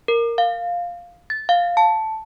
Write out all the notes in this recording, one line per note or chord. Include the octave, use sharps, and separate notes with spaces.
A#4
F5
A6
F5
A5